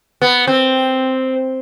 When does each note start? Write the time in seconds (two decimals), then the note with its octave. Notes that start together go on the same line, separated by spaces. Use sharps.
0.22 B3
0.47 C4